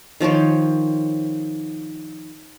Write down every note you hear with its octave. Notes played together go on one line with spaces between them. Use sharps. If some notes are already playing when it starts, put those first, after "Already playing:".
D#3 F3 C5 C#5